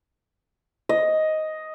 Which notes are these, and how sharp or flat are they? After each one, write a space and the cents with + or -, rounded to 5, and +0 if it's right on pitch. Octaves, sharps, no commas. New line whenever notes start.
D#5 +5